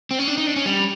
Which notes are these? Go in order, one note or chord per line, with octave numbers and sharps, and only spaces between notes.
C4
C#4
D4
D#4
D4
C#4
G3